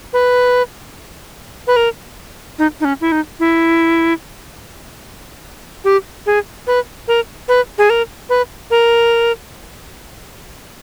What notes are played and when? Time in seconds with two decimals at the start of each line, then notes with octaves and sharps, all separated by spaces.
0.13 B4
1.67 B4
1.76 A#4
2.59 D#4
2.80 D#4
2.85 C#4
3.01 E4
3.12 D#4
3.39 E4
5.84 G4
6.26 G#4
6.67 B4
7.08 A#4
7.48 B4
7.78 G#4
7.90 A#4
8.29 B4
8.70 A#4